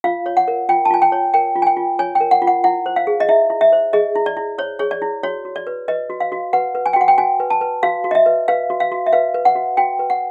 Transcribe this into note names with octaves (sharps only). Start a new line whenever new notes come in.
F4 F5
C#5
F#5
A#4
F4 G5
A5
F4 G#5
G5
C#5
A#4 G5
F4
G#5
G5
F4
C#5 G#5
G5
A#4
F#5
F4
F#5
E4 F#5
C5
F5
G#4
D#5
E4 E5
E4
E5
C5
G#4 D#5
E4
D5
E4
C5 C#5
G#4 C#5
D5
E4
F#4 C#5
F#4
D5
B4
B4 D#5
F#4
F5
F#4
B4 F#5
B4
G#5
G5
F#4 F#5
G5
F#4 G#5
B4
A5
B4
F#4 F5
F#4
D#5
E5
B4
B4 F5
F#4
F5
F#4
E5
B4 F5
B4
F#5
F#4
F#4 G5
B4
F#5